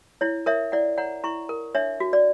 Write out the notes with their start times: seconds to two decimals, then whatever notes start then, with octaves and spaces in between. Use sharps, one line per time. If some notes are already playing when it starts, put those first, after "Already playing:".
0.21 E4 C#5
0.46 A#4 C#5 E5
0.72 E4 D5 F#5
0.97 C#5 F#5 A#5
1.24 E4 A#5 C#6
1.49 A#4
1.75 D4 C#5 E5
2.00 F#4
2.13 D5